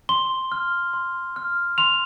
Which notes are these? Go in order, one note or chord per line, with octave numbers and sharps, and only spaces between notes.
C6 G7
F6
C6
F6
C6 F7